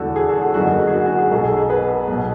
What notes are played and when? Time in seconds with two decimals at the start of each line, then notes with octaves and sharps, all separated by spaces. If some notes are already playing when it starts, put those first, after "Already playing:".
Already playing: E1 E2 D3 F#4 A4
0.16 G#4
0.28 F#4 A4
0.42 G#4
0.54 F#1 F#2 D3 F#4
0.67 G#4
0.80 F#4
0.87 G#4
0.93 F#4
1.06 F#4
1.19 G#4
1.31 B1 B2 F#4 A4
1.44 G#4
1.57 G#4
1.69 G#4 B4
2.08 B1 B2